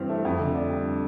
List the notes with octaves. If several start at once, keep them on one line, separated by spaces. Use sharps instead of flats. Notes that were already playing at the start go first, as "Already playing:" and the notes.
Already playing: G2 E3 C4
A3
F2
D3
D4
G3